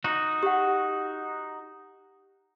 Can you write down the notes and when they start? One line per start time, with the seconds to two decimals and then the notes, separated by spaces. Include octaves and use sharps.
0.04 D#4 F#4
0.43 G4 F#5